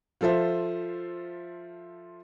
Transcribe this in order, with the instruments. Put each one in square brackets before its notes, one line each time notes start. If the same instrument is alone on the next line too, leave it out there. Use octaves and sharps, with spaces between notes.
[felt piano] F3 F4 A4 C5 E5